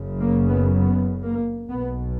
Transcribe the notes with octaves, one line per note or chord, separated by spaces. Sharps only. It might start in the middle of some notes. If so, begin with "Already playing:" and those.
Already playing: F#1 F#2 C#3
A#3
B3
B3
A#3
B1 B2 B3